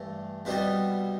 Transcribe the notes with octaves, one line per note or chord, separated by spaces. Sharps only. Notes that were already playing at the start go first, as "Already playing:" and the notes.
Already playing: G2 E3 A3
C2 B2 G3 B3 B4